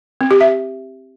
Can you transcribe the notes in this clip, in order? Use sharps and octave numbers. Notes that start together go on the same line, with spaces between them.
C4
G4
E5